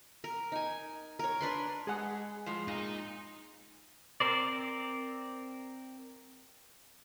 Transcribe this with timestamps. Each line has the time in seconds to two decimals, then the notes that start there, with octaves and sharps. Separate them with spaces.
0.24 A#4
0.52 D#4 G#5
1.19 A#4 C#5
1.41 D4 B4 C6
1.87 G#3 G#4 F#5
2.46 A2 F3 G#3
2.68 A#2 D#4
4.20 C4 A#4 C5 D5